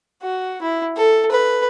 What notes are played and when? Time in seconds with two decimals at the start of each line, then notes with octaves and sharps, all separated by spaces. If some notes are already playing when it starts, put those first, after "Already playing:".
0.22 F#4
0.62 E4
0.96 A4
1.31 B4